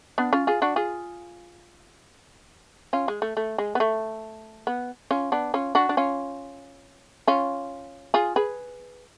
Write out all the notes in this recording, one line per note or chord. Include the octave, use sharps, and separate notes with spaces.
B3 D4
C#4 F4
F4 G#4
D4 F#4
F4 G#4
C#4 F4
G#3
A3
A3
G#3
B3
A3
B3
C#4 F4
B3 D4
C#4 F4
D4 F#4
D4
C#4 F4
C#4 F4
F4 G#4
G#4 B4